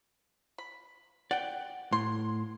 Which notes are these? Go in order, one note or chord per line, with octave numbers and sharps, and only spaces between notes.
B5
D5 F#5 G5
A2 C6